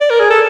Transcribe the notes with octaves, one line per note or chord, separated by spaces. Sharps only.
D5
A#4
G#4
A4